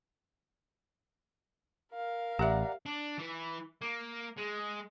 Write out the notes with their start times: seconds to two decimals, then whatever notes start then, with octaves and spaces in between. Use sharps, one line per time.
1.93 A#4 F5
2.39 A1 G4 D5 E5 F#5 A#5
2.86 D4
3.18 E3
3.82 A#3
4.37 G#3